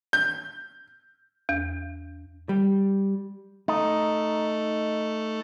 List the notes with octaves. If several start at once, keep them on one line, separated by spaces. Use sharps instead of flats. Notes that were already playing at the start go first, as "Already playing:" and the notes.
G6
E2
G3
A3 D#4